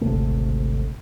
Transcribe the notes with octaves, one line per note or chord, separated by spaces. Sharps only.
G#1 D2 C3 A3